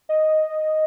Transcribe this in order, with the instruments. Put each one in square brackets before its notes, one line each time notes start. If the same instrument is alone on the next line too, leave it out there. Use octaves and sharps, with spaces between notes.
[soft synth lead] D#5